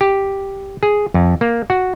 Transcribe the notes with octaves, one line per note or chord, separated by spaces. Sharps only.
G4
G#4
F2
A#3
F#4